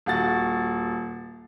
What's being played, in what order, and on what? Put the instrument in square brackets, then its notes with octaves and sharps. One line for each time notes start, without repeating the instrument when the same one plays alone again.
[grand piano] D#1 F#4 A6